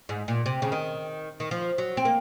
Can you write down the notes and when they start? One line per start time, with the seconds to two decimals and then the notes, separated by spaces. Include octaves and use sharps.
0.09 G#2
0.28 A#2
0.46 C3
0.62 C#3
0.72 D#3
1.40 D#3
1.51 F3
1.78 F#3
1.97 C4
2.05 A#3